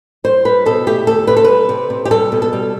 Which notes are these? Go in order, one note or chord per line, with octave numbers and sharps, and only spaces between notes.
G3 C5
G3 B4
B2 A4
A3 G4
D2 A4
C3 B4
A4
G3 B4
C3
C3
G4
G3 A4
B2
A4
G3